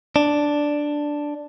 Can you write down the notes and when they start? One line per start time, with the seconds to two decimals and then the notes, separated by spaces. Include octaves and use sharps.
0.16 D4